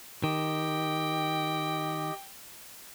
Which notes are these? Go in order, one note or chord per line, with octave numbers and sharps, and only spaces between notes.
D#3 G4 D#5 G5